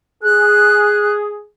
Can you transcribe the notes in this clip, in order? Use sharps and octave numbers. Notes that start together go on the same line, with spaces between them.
G#4 F#6